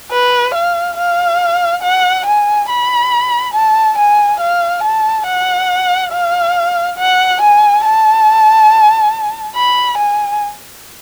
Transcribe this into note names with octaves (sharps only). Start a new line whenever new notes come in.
B4
F5
F5
F#5
G#5
B5
A5
G#5
F5
A5
F#5
F5
F#5
G#5
A5
B5
G#5